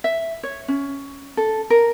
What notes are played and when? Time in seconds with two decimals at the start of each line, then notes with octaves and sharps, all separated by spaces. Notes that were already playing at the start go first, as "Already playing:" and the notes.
0.04 E5
0.43 C#5
0.68 C#4
1.37 A4
1.70 A#4